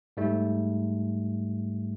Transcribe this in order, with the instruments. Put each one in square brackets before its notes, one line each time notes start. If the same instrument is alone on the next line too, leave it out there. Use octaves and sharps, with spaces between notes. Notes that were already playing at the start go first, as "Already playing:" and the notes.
[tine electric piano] G#2 G3 A3